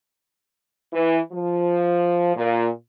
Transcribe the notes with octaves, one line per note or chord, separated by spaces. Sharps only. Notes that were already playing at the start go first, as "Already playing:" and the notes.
E3
F3
A#2